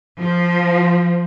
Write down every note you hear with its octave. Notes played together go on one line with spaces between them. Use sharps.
F3